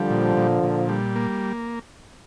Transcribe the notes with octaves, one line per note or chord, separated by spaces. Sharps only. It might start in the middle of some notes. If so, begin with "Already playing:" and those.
Already playing: D3 F3 G3
A#2
A#2
A#2
G3
A#3